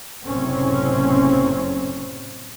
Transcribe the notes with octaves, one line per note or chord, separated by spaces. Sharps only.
F#1 A2 C3 C4 C#4